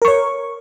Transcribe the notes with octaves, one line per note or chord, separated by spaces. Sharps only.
A#4 C#5 C#6